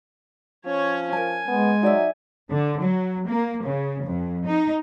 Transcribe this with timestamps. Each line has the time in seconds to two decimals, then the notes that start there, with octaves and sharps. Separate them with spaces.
0.66 F3 C#4 C#5
1.13 A#4 G#5 A5
1.48 G#3 B3
1.82 F#3 D#4 D5 E5
2.51 D3
2.81 F#3
3.27 A#3
3.64 C#3
4.04 F2
4.47 D#4